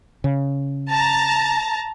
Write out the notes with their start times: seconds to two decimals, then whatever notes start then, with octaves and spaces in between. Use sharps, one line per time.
0.24 C#3
0.90 A5 A#5